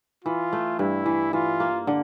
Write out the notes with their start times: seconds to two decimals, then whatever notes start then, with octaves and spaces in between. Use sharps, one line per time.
0.24 E3 F4
0.53 A3
0.79 G2 E4
1.06 E3
1.33 E3 F4
1.60 A#3
1.87 D3